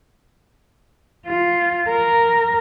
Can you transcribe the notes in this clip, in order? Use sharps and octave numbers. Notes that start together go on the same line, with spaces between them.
F4
A#4